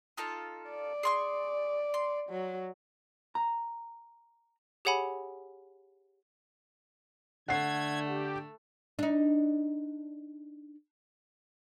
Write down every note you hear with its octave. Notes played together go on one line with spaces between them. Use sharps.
D#4 F4 A4
D5
G#4 C6 C#6
C6
F#3
A#5
G4 G#4 C#5 F#5 G#5 B5
D3 A3 F#5 G#6 C7
G4
D4 D#4